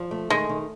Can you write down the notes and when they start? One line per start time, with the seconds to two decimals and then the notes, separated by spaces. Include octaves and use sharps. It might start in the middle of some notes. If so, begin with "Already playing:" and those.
Already playing: F3
0.11 A3
0.30 D#3 G#3
0.49 D#3